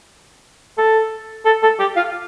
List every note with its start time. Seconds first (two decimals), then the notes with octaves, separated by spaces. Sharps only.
0.78 A4
1.45 A4
1.63 A4
1.79 G4
1.96 F4